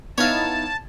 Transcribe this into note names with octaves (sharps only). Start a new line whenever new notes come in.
B3 D#4 E4 C#5 F5 A5